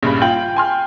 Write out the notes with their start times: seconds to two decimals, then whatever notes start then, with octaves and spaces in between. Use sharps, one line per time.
0.03 A#1 G2 C#3 B5
0.22 F4 G5 F#7
0.56 G#5 C6 F6